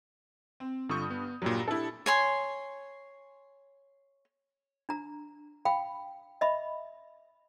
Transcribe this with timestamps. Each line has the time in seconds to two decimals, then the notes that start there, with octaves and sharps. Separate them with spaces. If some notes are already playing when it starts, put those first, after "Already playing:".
0.60 C4
0.89 G2 D3 F4 C#6 D#6 G6
1.10 B3
1.42 G2 A#2 F#3 G3
1.68 D4 E4 G4 A4
2.06 C#5 G#5 C6
4.89 D4 A#5
5.65 F5 G5 B5
6.41 D#5 E5 B5